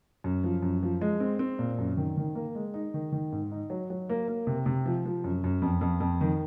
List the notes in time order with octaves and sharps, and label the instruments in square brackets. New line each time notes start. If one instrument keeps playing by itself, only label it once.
[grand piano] F#2
F3
F#2
F3
G#3
C4
C4
A#2
F#2
D#3
D#3
A#3
G#3
D#4
D#3
D#3
G#2
D#4
F#3
F#3
A#3
A#3
C3
C3
F3
F3
F#2
F#2
F2
F2
F2
D#3